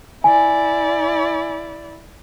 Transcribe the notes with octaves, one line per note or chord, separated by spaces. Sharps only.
E4 D5 G#5